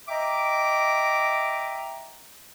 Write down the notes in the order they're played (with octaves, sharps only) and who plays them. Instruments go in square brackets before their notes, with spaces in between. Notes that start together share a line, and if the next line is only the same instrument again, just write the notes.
[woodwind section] D#5 E5 G5 A#5 D6